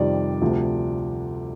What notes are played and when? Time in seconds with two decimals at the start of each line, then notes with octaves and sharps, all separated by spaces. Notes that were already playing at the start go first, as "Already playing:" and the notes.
Already playing: F2 C3 D#3 G3 D5
0.42 D2 C3 F3